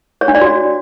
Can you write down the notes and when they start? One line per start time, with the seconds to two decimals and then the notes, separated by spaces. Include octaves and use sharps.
0.21 C#5
0.28 D4
0.35 D5
0.41 F#4